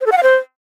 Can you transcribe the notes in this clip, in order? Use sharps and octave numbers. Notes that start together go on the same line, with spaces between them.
C5
A4
F#5
F5
C5